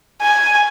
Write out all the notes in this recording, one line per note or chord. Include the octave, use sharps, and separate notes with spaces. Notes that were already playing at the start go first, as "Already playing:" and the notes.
G#5